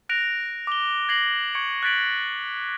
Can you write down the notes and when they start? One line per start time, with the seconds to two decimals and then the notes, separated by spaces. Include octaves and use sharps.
0.09 F#6 A#6 D7 F7
0.67 D6 G7
1.09 G#6 A#6 C7 F#7
1.54 C#6 G#6 C#7 D7
1.83 F#6 G#6 A6 B6 D7 F#7